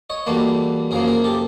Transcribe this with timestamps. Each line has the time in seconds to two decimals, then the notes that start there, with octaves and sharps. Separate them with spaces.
0.10 C#5 D#5
0.26 E2 B2 G3 A#3 A4 B4
0.91 F#2 C#3 F3 A#3 G#4 A#4
1.07 G#4 A#4
1.24 G4 A4